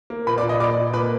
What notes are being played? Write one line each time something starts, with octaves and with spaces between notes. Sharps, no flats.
A#3
A#2 B4 B5
D5 D6
A#2
D#5 D#6
A#2 D5 D6
A#2
A#3 B4 B5